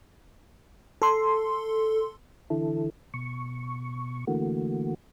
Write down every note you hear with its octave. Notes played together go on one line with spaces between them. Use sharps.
A4 C6
D3 E3 E4 A4
B2 C#6
D3 E3 A3 A#3 F#4